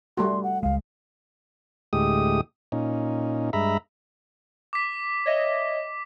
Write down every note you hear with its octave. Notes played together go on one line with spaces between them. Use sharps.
G3 A3 F#4 C6
F#5
C#2 G#3 F5
D2 A2 G#3 G4 D#6
A#2 C#4 D#4
G2 G#3 E5 A#5 B5
D6 B6
C#5 D#5 E5